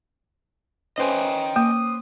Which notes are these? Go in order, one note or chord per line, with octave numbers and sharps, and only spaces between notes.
C#4 B4 C5 D#5 G5 G#5
A#3 D#6